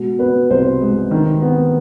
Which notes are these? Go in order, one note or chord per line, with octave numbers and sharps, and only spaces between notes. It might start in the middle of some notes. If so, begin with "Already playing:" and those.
Already playing: B2 G#3
B3 B4
C2 C5
G#3
D#3
B3